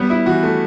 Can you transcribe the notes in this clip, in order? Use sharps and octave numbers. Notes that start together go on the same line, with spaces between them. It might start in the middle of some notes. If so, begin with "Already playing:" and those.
Already playing: G3 B3
E4
E3 F#4
A3